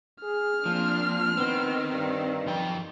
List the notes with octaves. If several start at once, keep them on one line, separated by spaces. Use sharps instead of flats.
G#4 F6
A#2 F3 A#3 C4 D4
D#3 B3 C4
G2
F#2 F3 G5